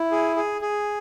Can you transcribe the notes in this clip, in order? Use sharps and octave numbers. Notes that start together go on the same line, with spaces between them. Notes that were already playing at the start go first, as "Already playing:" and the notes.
Already playing: E4
G#4
G#4
G#4